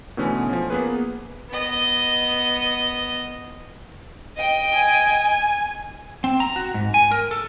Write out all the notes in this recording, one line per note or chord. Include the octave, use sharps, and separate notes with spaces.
B2 D3 E3 A3 B3 C#4
F3 C#4
A#3 B3 G#4 B4
B3 D#5
D#5 G5
G#5
C4
A#5
F#4
G#2
G#5
A#4
A4